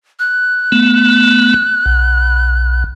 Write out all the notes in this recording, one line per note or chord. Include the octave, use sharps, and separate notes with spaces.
F#6
A3 B3
B1